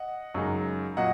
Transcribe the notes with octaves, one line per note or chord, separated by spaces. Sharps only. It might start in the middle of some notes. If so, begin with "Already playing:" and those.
Already playing: D#5 F#5
F#2 C#3 G#3 D#4
A#2 F#3 D#5 F#5